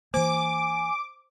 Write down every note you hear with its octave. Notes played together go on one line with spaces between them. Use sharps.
E3 A#3 C5 G#5 D6